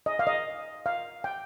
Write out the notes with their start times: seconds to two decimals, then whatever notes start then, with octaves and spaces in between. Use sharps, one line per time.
0.06 D#5
0.19 F5
0.27 D#5
0.86 F5
1.24 G5